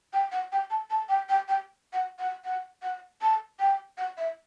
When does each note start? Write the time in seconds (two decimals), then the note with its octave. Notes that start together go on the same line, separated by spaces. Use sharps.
0.13 G5
0.32 F#5
0.52 G5
0.70 A5
0.90 A5
1.09 G5
1.29 G5
1.48 G5
1.93 F#5
2.19 F#5
2.45 F#5
2.83 F#5
3.22 A5
3.59 G5
3.98 F#5
4.17 E5